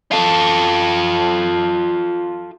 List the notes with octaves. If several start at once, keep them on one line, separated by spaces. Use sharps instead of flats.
F4 A4